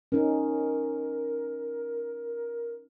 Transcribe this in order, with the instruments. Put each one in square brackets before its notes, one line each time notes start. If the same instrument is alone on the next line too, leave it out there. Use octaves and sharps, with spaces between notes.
[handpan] C#4 D#4 [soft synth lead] A#4